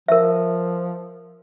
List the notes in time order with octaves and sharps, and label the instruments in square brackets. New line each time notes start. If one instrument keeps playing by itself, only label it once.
[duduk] F3 [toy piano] A#4 E5